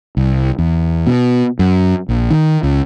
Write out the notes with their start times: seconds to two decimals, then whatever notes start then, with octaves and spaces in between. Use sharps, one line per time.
0.17 C2
0.59 E2
1.07 B2
1.59 F#2
2.09 A#1
2.31 D#3
2.63 C#2